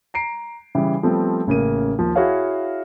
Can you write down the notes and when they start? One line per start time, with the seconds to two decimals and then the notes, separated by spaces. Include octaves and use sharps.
0.14 A#5 C7 D7
0.75 C#3 E3 G3
1.03 F3 G3 A3 B3 C4
1.47 A1 C#3 A#3 D#7
1.99 D#2 F3
2.15 E4 F#4 G#4 C#5 F5